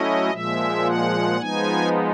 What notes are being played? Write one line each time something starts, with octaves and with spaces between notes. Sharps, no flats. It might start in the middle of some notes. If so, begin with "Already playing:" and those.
Already playing: F#3 A3 C#4 E4 D#5
A#2 F3 G#3 E5
F#5
F3 G#3 B3 D#4 G#5